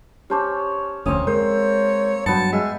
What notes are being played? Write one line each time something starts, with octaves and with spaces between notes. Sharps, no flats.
C#4 G4 C5 C#5 A5 D6
F1 D2 A#3 C4 C#4 D#6
G#3 A#4 C5 C#5
G2 F#3 B3 B4 G5 A5 C#7
G#3 E5